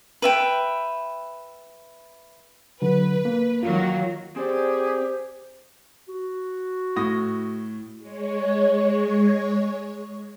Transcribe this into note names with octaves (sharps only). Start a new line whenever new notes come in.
B4 E5 G5
D3 F#3 B4
A#3
D#3 F#3 A#3 F4
C4 G4 G#4 C5 D5
F#4
A2 D#6 A#6
G#3 C#5